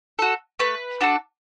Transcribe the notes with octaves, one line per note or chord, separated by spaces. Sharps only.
F#4 A4
A3 B4
D4 F#4 A4